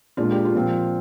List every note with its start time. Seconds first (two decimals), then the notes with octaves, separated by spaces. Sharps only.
0.17 A#2 G#3 D4 F4
0.32 G4
0.45 F4
0.55 A#2 F3 C4